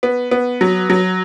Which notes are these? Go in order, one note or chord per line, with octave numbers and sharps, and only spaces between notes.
B3
B3
F#3
F#3